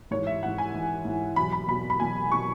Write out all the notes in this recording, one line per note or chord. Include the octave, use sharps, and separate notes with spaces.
G#2 E3 C#5
E5
G#2 E3 F#5
G#5
G#2 E3
G#2 E3
E2 B2 F#3 B5
B5
E2 B2 F#3 B5
B5
E2 B2 F#3 G#5
B2 F#3 C#6